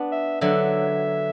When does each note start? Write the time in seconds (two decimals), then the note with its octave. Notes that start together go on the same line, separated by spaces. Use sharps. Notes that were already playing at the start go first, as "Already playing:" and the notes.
Already playing: B3 D4
0.12 E5
0.41 D3 F#3 E5